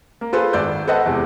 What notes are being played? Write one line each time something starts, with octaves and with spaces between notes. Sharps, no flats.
A#3
F4 G#4 A4 B4 C5 C6
G#1 D5 E6 G6
A4 B4 C5 D#5 F#5 A5
E2 C3 G#3